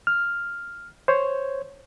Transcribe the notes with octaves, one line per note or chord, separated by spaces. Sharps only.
F6
C5 C#5